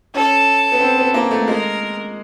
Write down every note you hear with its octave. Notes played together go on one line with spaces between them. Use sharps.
C#4 A4
B3
C4
B3
A#3
A3
G#3 A#4